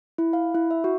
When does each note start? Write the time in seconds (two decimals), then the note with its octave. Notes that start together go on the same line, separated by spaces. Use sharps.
0.18 E4
0.33 F5
0.55 E4
0.71 E5
0.84 F#4